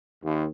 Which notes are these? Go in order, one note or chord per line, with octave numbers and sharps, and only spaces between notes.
D#2